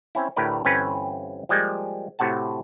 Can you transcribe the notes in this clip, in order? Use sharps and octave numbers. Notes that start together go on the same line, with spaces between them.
C4 C#4 E4
D2 A2 G4 A#4 B4 D5
G1 E3 C4 C#4 B4
F3 G3 G#3 A#3
A2 C3 F#4 F#5 A5